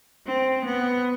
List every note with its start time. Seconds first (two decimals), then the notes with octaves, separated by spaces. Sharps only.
0.26 C4
0.65 B3